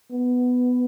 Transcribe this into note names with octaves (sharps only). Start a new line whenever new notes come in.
B3